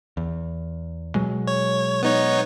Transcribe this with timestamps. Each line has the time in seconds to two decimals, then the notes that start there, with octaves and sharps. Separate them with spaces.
0.17 E2
1.15 B2 F#3 G#3
1.48 C#5
2.03 B3 D#4 C#5